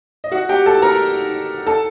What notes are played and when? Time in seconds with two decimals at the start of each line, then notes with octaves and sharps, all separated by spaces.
0.24 D#5
0.32 F#4 F#5
0.49 G4 G5
0.66 A4 A5
0.82 A#4 A#5
1.66 A4 A5